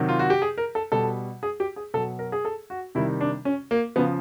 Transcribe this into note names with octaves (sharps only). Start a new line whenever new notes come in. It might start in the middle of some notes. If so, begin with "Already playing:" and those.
Already playing: C3 D#3 F#3
F4
F#4
G4
G#4
A#4
A4
B2 G3 A4
G#4
G4
G#4
B2 F#3 A4
A#4
G#4
A4
F#4
C3 D#3 G3 E4
D4
C#4
A#3
C#3 F3 B3